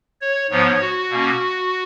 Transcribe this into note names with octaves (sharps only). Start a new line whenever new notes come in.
C#5
G#2 F3 B3 C#5
F#4
B2 A#3 C#4